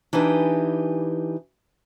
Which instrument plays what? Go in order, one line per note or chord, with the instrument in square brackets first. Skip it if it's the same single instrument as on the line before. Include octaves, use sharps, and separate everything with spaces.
[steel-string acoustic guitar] E3 D4 D#4 G4 B4